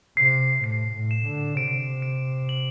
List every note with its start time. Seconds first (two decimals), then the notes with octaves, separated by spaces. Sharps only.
0.17 C3 C7
0.64 A2 C7
0.95 A2
1.11 E7
1.26 D3
1.56 C3 D7
2.02 D7
2.49 F#7